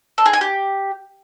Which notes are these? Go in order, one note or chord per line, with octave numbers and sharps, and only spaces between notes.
A4
G#4
G#5
G4